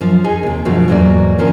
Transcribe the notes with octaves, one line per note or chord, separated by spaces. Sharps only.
F#2 F3
D#4 G#4 G#5
D#2 C3
F#2 B2 D3 F3 F#3 A3
E2 G#2 F#3 A3 A#3 D5
D3 D#3 F3 C#4 A#4